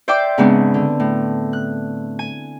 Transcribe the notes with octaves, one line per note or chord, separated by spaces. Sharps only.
C5 D5 E5 G5 C6 D6
G#2 C#3 G#3 B3 C4 D4
D3
A2
F#6
G#5